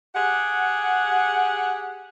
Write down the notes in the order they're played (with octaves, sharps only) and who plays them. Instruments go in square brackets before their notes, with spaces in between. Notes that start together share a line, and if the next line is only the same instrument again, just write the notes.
[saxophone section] G4 G#4 F#5